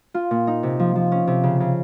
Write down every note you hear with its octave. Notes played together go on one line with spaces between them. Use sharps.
F4
A#2
D#4
C3
F3
F3
C#4
C3
C#3
C#3